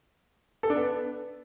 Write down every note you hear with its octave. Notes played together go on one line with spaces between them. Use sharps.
A4
D4
B3